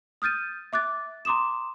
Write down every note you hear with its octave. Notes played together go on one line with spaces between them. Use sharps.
D#6 F6 G6 A6 D#7
E5 D6 F#6 A6
A#5 C6 D6 D#6 E7